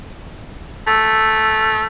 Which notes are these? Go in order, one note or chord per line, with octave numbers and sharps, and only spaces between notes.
A3 E6